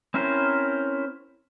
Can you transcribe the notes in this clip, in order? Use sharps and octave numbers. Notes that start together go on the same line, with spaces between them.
C4 C#4 E4 A#4 C5